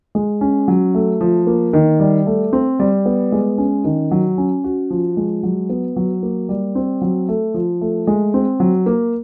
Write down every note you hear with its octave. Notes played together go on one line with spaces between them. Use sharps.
G#3
C#4
F#3
A3
F3
A#3
D#3
G3
A3
C4
G3
B3
G#3
C#4
D#3
F#3
C#4
F#4
F3
G#3
F#3
B3
F#3
A#3
G3
C4
F#3
A3
F3
A3
G#3
C4
F#3
A#3